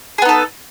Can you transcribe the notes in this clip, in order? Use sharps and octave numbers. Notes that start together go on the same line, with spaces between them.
B3 D#4 G#4 A4